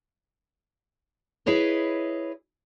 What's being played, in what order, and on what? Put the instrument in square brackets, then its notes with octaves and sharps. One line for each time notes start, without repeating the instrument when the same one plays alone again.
[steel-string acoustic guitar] E4 G#4 B4 C#5 D#5